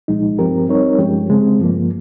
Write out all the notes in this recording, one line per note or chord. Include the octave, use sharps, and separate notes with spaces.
C2 A#2 F3 G#3 D#4
G2 F3 C4 G4 A#4
G3 C4 D#4 A#4 C#5
G2 F3 G#3 C#4 G4
C#3 G#3 C4
G2 F3 A#3